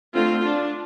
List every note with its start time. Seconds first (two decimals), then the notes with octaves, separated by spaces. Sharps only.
0.14 D3 A3 C4 F4
0.44 D4